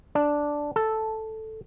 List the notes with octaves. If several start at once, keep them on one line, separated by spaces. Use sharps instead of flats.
D4
A4